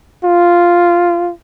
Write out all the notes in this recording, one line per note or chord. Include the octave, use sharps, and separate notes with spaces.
F4